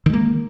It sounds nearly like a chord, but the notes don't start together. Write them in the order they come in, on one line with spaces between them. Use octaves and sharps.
D#3 G#3 A#3